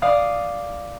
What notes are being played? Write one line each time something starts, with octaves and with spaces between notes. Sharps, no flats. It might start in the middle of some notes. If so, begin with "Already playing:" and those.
D5 F5 D#6